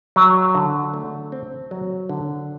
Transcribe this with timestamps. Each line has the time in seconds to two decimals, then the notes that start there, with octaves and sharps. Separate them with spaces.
0.16 F#3
0.55 D3
0.94 A3
1.32 C4
1.71 F#3
2.09 D3